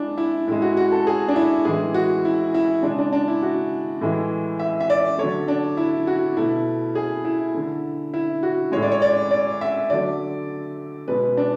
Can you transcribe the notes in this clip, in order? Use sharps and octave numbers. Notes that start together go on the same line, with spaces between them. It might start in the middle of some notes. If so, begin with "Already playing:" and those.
Already playing: G#3 D4 E4
E4
A2 G#3 E4
F#4
F#4
A4
G#4
D4
E4
A2 E3 G#3 G#4
F#4
E4
E4
C#3 G#3 D4
D4
D4
E4
F#4
A2 E3 G#3
E5
E5
D5
D3 F#3 A3 C#5
D4
E4
F#4
B2 A3 E4
G#4
E4
D3 A3
E4
F#4
A2 G#3 C#5
D5
C#5
D5
D5
E5
D3 F#3 A3 D5
B2 G#3 B4
D4